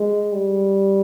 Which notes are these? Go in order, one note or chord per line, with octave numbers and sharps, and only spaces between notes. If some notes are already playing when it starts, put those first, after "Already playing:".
Already playing: G#3
G3